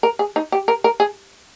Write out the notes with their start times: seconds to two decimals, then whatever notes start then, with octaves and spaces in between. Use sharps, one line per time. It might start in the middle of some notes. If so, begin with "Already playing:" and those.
0.03 A#4
0.19 G#4
0.36 D#4
0.52 G4
0.68 A#4
0.84 A#4
1.00 G#4